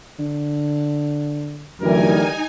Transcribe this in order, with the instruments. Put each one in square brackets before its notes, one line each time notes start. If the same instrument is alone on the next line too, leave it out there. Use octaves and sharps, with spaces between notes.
[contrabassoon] D3
[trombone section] F#2 E3 A3 [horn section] D3 G3 A#4 [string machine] D#4 G#5